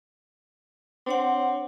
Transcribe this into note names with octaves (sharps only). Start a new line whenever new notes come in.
C4 D4 C#5 F#5